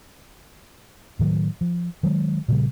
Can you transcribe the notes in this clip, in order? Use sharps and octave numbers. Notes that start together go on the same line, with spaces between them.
A2 D#3 E3 F#3
F3
D#3 F#3 G#3
A#2 C#3 G3